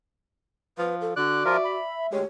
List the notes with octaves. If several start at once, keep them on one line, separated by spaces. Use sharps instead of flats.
F3 B4
A4
D3 F#4 D5 F#6
F3 F4 A#4 E5
B5
D2 G#3 G4 C#5